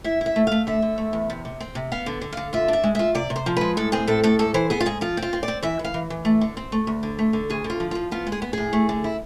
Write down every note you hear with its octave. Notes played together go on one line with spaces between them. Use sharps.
E4 E5
E4
E5
A3
A3 F5
D3 E5
D3
A3
E2
C3
C3
C4
C3
B3 F5
D3
D3
D3 F5
F4 E5
D4 E5
G#3
F4 E5
C3 D5
C3
C5
F3
G#3 B4
A2 A4
C4 G#4
A2 A4
A2 A4
G#2 A4
E3 C5
B3 G#4
F4
G#2 G#4
F3 F4
C4
F4
C4
D5
C4
E3 E5
E3
F5
E3
E3
A3
D3
C4
A3
D2
D3
A3
D3
D2 G#4
D3
F4
F3
F3 F4
B3 F4
G#3
G#4
B3
A2 G#4
A3
D3
E4